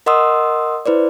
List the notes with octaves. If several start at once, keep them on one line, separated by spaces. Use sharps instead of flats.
A#4 D#5 F#5 C6 D#6 E6
E4 B4 C5 D5